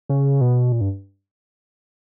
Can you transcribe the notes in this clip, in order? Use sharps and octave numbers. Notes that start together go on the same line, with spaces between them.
C#3
B2
A#2
G2